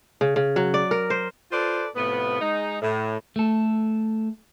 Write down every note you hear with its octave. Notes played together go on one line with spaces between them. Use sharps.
C#3
C#3
F#3
D5
A#4
C5
F4 A4 B4 C5 D5
A2 C3 F3 B3
G#3 D#4
A2
A3 A4